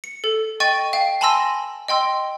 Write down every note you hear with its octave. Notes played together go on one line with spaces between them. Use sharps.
C#7
A4
D#5 G5 C#6 A6 D#7
F5 G5
G#5 A5 B5 C6 E6 A#6
D#5 G5 C6 E6